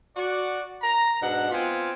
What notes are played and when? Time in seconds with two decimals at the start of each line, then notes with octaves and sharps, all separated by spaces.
0.15 F#4 D5
0.82 A#5
1.22 G#2 B2 D4 F#5
1.51 B3 C4 F4 G#5